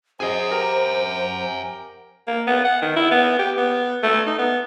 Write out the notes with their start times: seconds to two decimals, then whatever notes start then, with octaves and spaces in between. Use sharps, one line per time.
0.20 G#4 C5 D#5 F#5 G#5
0.51 G4 A#4
2.27 A#3
2.47 B3
2.64 F#5
2.82 D#3
2.96 E4
3.11 B3
3.39 G4
3.57 B3
4.03 A3
4.26 D#4
4.39 B3